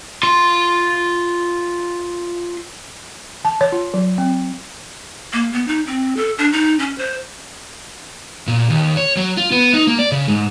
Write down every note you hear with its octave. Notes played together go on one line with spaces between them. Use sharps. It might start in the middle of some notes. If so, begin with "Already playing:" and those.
F4 C6
A5
C#5
F4
F#3
C4
A#3
B3
D#4
C4
A4
D4
D#4
C#4
C5
A#2
D#2
C#5
F#3
F4
B3
D#4
A#3
D5
C#3
G#2